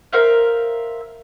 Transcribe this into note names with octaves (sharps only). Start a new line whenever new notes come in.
A#4 C5 E5 F5